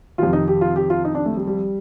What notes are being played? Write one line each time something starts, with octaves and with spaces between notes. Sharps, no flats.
F2 C3 D#3 F4
D#4
G4
F4
G4
F4
D#4
D4
A3
G3
G3